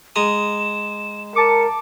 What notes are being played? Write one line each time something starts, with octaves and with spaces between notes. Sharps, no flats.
G#3 A#5 D#6 E7
A#4 A5 D6 C#7